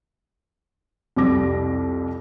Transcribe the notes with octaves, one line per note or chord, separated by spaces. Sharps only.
C2 F2 G3 D6 A#6